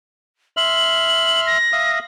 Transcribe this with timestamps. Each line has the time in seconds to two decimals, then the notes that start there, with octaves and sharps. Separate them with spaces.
0.57 E5 C6 F6 F#7
1.47 A#6
1.73 E5 F5 D#6